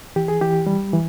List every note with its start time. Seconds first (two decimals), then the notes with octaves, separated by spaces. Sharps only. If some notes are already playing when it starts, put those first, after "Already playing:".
0.16 E3 G4
0.28 G#4
0.41 E3 G4
0.67 G3
0.93 E3